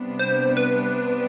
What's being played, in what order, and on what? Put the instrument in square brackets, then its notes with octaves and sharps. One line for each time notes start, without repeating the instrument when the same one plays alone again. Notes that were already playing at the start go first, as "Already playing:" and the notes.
Already playing: [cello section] C3 G3 B3 D4
[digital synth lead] C5
B4